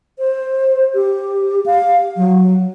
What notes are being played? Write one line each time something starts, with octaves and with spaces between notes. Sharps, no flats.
C5
G4
F5
F#3